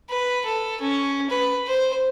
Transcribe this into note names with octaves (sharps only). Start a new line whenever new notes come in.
B4
A4
C#4
B4
C5